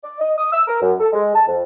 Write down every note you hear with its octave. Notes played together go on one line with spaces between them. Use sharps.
D5
D#5
D#6
E6
A#4
F#2
A4
G#3
A5
F2